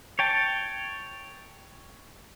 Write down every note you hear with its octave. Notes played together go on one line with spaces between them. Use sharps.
C#5 G5 A5